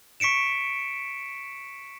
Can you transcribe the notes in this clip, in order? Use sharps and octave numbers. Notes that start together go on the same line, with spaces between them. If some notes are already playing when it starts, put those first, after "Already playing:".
C#6 B6 C#7 D7 E7